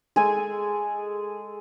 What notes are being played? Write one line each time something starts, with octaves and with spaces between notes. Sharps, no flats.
G#3 G#4 A4 G#5